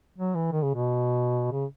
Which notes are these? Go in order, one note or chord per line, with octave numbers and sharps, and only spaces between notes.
F#3
E3
D#3
C#3
B2
C#3